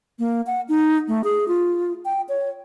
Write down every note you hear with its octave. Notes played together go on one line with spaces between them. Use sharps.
A#3
F#5
D#4
A3
G#4
F4
G5
C#5